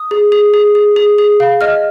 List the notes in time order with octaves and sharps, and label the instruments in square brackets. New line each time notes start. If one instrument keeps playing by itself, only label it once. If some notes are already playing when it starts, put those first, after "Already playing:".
Already playing: [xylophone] D#6
G#4
G#4
G#4
G#4
G#4
G#4
F5
D#5 F6